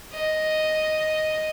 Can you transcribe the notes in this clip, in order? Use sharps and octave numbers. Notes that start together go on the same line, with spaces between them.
D#5